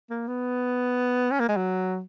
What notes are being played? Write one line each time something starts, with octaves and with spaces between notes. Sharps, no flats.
A#3
B3
C#4
A#3
G#3
F#3